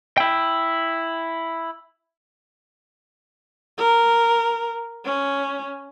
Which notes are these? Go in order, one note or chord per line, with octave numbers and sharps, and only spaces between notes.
E4 G5
A#4
C#4